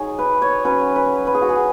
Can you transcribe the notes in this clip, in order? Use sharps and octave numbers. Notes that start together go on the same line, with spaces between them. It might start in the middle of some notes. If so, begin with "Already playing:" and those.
Already playing: F#3 D#4 G#4 C#5
B4
C#5
F#3 C#4 B4
B4
B4
G#4
F#4
G#4